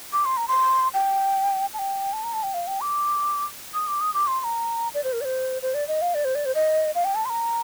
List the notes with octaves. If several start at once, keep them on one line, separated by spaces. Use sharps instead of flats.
D6
C6
A#5
C6
G5
A5
G5
A5
A#5
A5
G5
F5
G5
D6
D#6
D6
D#6
D6
C6
C6
A#5
D5
C5
A#4
D5
C5
C5
D5
D#5
F5
D5
C5
D5
C5
D#5
F5
G5
A5
C6
A#5